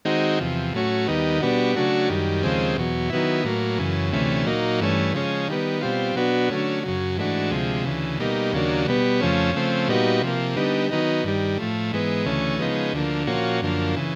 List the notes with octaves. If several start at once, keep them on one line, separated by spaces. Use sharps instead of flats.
D#3 G#3 C4 D#4 F#4
E2 C3 F3
A2 F#3 A3 C#4 F#4
D#2 D#3 G3 B3 D#4
B2 G3 B3 D4 F#4
C#3 F#3 A3 D4 F#4
F#2 D#3 G3
D#2 C#3 F3 G#3 C4
E2 B2 F#3
D#3 F#3 B3 E4
A2 F#3 A#3
F#2 C#3 E3
D2 C3 E3 A3 C#4
A#2 F#3 A#3 D#4
G2 E3 A3 C#4
C#3 F3 G#3 C#4
D#3 G3 B3
B2 G3 C4 F4
B2 F#3 B3 D4 F#4
D3 F#3 A3 C#4
F#2 C#3 F#3
G#2 E3 A3 D4 F#4
D2 C3 F3 G#3
D2 C#3 E3
B2 G3 A#3 D#4
D#2 C#3 F#3 A#3 D4
B2 G3 B3
F2 C#3 F3 A3 C#4
C#3 F3 A3 C4
A#2 G3 B3 D#4 F#4
C3 F3 A#3
D3 G3 B3 D#4
D#3 F#3 B3 D#4
G2 D#3 G3
A2 F3 A3
G#2 E3 G#3 B3
D2 C#3 E3 A3 C#4
C#3 F3 G#3 B3 D#4
D2 D3 F3 A#3
A#2 F3 A#3 C#4 F#4
F#2 D3 F3 A#3
C#3 E3